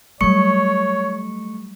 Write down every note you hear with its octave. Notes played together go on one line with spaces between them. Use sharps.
F#3 G3 A3 C#5 C#6 C#7